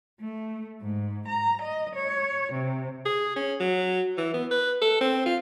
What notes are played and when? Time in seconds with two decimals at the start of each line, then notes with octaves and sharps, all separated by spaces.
0.19 A3
0.81 G#2
1.27 A#5
1.61 D#5
1.95 C#5
2.52 C3
3.06 G#4
3.36 C#4
3.60 F#3
4.18 E3
4.34 B3
4.51 B4
4.81 A4
5.01 C4
5.26 F4